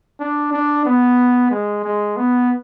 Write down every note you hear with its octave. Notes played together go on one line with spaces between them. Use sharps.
D4
D4
B3
G#3
G#3
B3